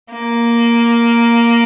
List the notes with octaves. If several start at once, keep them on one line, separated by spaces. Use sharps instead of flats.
A#3